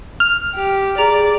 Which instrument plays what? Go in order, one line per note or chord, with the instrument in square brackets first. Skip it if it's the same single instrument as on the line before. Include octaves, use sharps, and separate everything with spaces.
[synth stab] F6
[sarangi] G4
[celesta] G#4 A#5 F7 [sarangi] D5